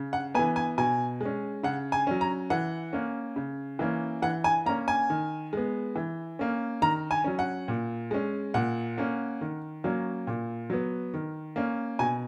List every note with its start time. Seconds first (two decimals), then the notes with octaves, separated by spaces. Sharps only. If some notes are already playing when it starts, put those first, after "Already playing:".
Already playing: C#3
0.13 F#5
0.35 B3 G#5
0.39 E3
0.56 G#5
0.78 B2 G#5
1.21 G#3 C#4
1.63 C#3 F#5
1.92 G#5
2.07 F#3 C#4
2.21 A#5
2.50 E3 F#5
2.93 A#3 C#4
3.36 C#3
3.79 E3 A#3 C#4
4.22 E3 F#5
4.44 G#5
4.66 A#3 C#4 A#5
4.88 G#5
5.10 D#3
5.53 G#3 B3
5.96 E3
6.39 A#3 C#4
6.82 D#3 A#5
7.11 G#5
7.24 F#3 C#4
7.39 F#5
7.68 A#2
8.11 G#3 C#4
8.54 A#2 F#5
8.98 A#3 C#4
9.41 D#3
9.84 F#3 A#3 C#4
10.27 A#2
10.70 F#3 B3
11.14 D#3
11.56 A#3 C#4
11.99 B2 G#5